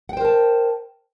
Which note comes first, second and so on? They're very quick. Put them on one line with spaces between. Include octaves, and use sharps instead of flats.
F#5 G5 C5 A#4 A5